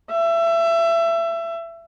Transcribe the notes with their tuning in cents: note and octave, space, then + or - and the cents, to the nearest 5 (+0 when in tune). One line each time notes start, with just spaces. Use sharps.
E5 +25